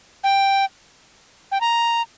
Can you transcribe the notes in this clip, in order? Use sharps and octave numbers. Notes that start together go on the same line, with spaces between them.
G5
G5
A#5